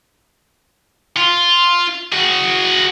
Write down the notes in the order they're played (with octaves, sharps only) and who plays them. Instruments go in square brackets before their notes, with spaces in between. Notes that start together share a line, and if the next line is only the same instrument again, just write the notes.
[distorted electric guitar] F4
F#4 G#4